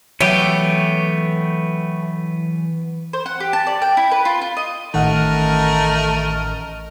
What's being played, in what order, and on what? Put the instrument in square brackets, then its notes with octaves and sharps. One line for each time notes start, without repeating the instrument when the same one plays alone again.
[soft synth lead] E3 [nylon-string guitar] F#3 C#5 [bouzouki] A3 [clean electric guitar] B3 G4
[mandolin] C5
F#5
G4
A5
D5
G5
E4
B4
F4
F4
D#5
[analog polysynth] A1 F6 [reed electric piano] D#3 F#5 [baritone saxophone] A3 [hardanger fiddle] A#4 D#5